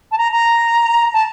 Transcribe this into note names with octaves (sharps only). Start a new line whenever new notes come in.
A5
A#5
A#5
A5